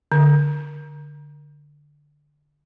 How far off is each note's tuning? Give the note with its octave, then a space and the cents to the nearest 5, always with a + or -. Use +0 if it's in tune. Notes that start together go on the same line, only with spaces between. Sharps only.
D3 +0